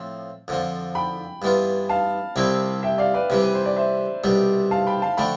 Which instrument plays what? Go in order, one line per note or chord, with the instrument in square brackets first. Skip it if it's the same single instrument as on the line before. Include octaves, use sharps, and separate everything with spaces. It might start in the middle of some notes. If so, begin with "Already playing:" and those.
Already playing: [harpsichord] A2 F3 C4
F2 D3 F3
[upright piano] G5 B5
[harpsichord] G2 E3 B3 F4
[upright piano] F5 A5
[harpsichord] C2 C3 G3 C4 E4
[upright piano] E5 G5
D5 F5
B4 D5
[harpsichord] C3 E3 G3
[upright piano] B4
C5
D5
C5 E5
[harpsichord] C2 B2 G3 D4
[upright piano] F5 A5
G5 B5
F5 A5
[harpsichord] D3 F3 A3 D4 [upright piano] G5 B5